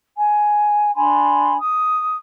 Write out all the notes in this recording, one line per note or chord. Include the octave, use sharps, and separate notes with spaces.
G#5
D4 G#5 B5 C6
D#6